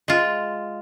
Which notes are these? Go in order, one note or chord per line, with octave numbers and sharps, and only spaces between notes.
G#3 F4